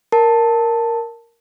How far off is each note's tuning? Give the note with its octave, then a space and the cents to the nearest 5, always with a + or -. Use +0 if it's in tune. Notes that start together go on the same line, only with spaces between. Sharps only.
A#4 +0 A5 +5